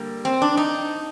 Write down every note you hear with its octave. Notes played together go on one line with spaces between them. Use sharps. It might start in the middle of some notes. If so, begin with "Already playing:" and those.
Already playing: D3 G3 A#3
C4
D4
D#4